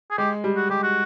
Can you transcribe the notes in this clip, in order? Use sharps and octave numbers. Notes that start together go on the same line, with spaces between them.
G#4
G#3 G4
G3
F#4
G#3 G4
F#4